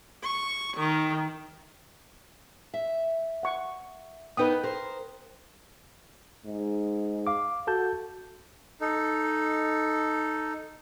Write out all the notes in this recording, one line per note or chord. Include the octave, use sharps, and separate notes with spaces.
C#6
D#3
E5
F#5 C#6
B3 D#4 A#4 B4 G5 D#6
A#4 C5
G#2
F5 D6
F#4 A4 A5 G6
D#4 A4